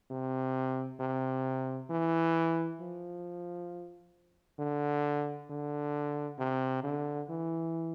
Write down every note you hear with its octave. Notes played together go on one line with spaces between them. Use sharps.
C3
C3
E3
F3
D3
D3
C3
D3
E3